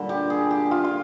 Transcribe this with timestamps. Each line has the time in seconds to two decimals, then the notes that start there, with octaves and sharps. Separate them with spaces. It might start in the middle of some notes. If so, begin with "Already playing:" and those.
Already playing: A#2 D3 G3
0.09 G4
0.30 G#4
0.51 G4
0.71 F4
0.85 F4